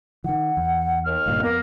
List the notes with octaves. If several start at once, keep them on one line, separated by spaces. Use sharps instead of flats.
D#3 E3 F#5
E2
D#2 F6
F#1 G2 A#2 F5
F2 A#3 B3 A#4